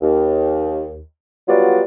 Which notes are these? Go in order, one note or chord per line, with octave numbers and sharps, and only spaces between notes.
D#2
F#3 G3 B3 F4 F#4 D5